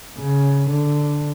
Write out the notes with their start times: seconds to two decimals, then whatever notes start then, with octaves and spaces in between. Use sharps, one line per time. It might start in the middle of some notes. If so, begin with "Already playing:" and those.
0.19 C#3
0.70 D3